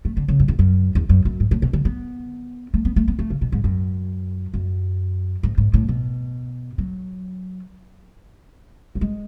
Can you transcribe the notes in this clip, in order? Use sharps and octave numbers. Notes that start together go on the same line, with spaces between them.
A3
D3
C#3
F#2
E2
F#2
E2
F#2
F#2
G#2
A2
B2
D3
B3
A3
B3
A3
B3
A3
C#3
B2
G#2
F#2
F#2
G#2
G#2
A2
B2
F#3
F#3
G#3